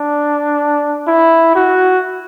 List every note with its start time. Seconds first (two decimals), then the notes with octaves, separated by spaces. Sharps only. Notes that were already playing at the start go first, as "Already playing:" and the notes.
Already playing: D4
1.08 E4
1.56 F#4